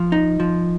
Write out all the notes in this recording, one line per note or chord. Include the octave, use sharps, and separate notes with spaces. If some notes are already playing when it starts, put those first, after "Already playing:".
Already playing: F3
D#4
F3